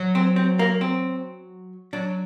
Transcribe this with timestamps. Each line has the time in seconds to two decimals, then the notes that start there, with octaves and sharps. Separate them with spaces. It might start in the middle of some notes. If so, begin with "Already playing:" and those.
Already playing: F#3
0.15 C4
0.36 C4
0.59 A#3
0.81 C4
1.93 F#3 D4